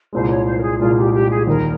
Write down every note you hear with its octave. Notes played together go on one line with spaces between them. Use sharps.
C2 A#2 G#3 C5
C#5
C5
A#4
G#4
C2 A#2 G#3 F4
G4
G4
G#4
D#2 D#3 G3 A#4